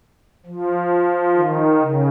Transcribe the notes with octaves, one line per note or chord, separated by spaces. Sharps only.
F3
D#3
C#3